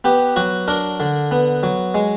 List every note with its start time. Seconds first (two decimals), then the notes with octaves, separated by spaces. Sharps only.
0.04 B3 G4
0.36 F#3 F#4
0.68 D4 A#4
1.00 D3
1.31 B3
1.63 F#3
1.94 G#3